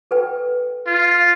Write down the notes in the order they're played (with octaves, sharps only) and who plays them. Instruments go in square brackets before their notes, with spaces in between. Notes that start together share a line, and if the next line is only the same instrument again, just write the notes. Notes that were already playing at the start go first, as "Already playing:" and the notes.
[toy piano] A4 B4 G5
[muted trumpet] F4